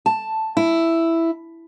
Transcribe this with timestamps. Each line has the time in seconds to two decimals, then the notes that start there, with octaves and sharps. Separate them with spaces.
0.06 A5
0.57 E4